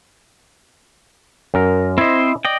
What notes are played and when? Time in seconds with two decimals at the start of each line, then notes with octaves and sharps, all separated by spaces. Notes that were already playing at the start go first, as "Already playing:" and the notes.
1.54 F#2 A#4
1.98 C4 E4 C5 D#5
2.45 D5 D#5 G5